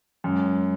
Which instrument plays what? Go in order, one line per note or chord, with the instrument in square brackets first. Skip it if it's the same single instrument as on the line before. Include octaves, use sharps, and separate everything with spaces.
[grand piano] F#2 [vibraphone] G#3